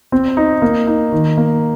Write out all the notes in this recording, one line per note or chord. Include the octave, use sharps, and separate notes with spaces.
C4
D#4
A#3
D#4
D#3
A#3